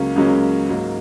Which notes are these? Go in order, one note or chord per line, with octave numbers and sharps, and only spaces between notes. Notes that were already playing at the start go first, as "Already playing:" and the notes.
Already playing: C#2 C#3 F#3 A#3 C#4 F5
C#2 C#3 F#3 A#3 C#4
G#2 F#3 A#3